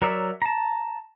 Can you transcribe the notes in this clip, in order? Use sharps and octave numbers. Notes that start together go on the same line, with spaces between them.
F#3 A#4 C#5 D5 E5
A5 A#5